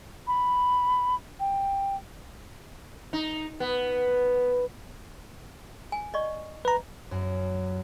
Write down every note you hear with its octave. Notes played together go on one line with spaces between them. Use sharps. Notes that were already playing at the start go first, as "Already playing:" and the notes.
B5
G5
D#4
B3
G#5
D5 D#5 C#6
B4 A#5
F#2